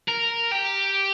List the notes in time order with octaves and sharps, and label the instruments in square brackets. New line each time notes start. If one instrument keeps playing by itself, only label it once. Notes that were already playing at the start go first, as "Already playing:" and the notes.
[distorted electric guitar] A#4
G4